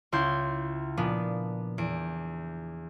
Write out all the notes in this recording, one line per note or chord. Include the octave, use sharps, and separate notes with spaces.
C#2 E4 C6 G6
A#2 F3 B3 D4
E2 D7